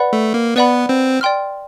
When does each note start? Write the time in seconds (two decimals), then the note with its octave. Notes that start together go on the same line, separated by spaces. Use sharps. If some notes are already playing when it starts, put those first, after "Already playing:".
Already playing: B4 D5 F#5 B5
0.13 A3
0.34 A#3
0.56 B3 B4 D5 F#5 B5
0.89 C4
1.21 D5 G5 C6 F6